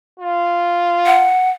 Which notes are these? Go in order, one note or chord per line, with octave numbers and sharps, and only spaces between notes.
F4
F#5